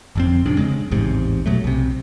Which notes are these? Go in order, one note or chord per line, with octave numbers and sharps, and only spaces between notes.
G1 F2 C4
D1 F2 C3 D4
C#3 G#3
A1 E2 G#2 C3
B2 F#3 A3
B1 C3